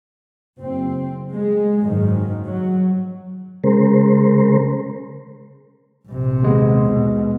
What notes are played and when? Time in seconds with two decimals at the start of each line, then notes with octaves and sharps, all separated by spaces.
0.59 F#1 C4
1.33 G#3
1.83 F#1 G#2 D#3
2.46 F#3
3.64 C#3 G#3 A#4 C5
6.08 A#1 C3
6.43 D#2 G#3 B3
6.89 B2